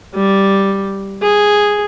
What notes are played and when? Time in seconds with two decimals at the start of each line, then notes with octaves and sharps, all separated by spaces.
0.15 G3
1.23 G#4